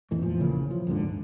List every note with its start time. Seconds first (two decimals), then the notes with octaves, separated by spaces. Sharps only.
0.11 D#1 F2 E3 A3
0.22 A#2 F3
0.40 A#1 C#3 E3 A#3
0.71 F3
0.87 F#1 D#2 G#2 D3
1.07 G#1